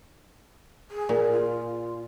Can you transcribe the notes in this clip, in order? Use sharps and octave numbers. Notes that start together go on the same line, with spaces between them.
G#4
A#2
F4